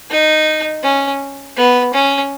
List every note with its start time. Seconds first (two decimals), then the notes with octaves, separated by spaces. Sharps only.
0.10 D#4
0.83 C#4
1.56 B3
1.93 C#4